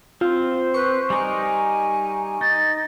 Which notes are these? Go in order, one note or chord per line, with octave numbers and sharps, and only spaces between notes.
C4 F4 C5
B4 C#6
G3 D#4 A#4 G#5
D#4 A6